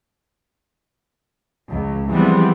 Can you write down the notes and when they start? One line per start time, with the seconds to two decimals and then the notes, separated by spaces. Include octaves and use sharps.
1.70 C#2
2.11 E3 F3 G3 G#3 B3 C4